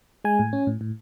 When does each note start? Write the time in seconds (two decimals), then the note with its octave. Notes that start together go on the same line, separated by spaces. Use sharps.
0.24 G#3 G#5
0.39 A2
0.53 C#4
0.67 A2
0.81 A2